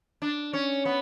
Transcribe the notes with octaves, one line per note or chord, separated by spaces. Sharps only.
D4
C#4
B3